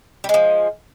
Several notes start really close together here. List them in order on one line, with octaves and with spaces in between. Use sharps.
G3 G#3 F3